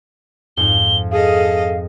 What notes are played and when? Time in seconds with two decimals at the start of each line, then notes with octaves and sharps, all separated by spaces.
0.57 F2 G#2 G7
1.11 G#4 A4 D#5 F5